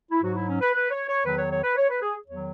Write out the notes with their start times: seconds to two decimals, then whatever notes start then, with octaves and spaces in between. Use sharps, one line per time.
0.11 E4
0.23 G#2 F#3 F#4
0.35 E4
0.48 C#4
0.61 B4
0.74 B4
0.91 C#5
1.08 C#5
1.25 E2 D#3 F#3 B4
1.38 C#5
1.51 C#5
1.64 B4
1.77 C#5
1.90 B4
2.02 G#4
2.28 E2 D#3 F#3 C#5